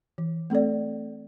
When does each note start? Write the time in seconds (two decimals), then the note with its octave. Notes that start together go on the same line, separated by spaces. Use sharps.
0.18 E3
0.50 A3 C4 A4 D5